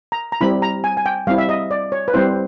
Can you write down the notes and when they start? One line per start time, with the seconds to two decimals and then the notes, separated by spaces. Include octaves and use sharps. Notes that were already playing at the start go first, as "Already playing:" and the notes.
0.12 A#5
0.32 A#5
0.41 G3 C4 E4 B5
0.62 A#5
0.84 G#5
0.97 G#5
1.06 G5
1.27 G3 C4 E4 F5
1.38 E5
1.49 D#5
1.71 D5
1.92 C#5
2.08 B4
2.14 G3 C4 E4 C5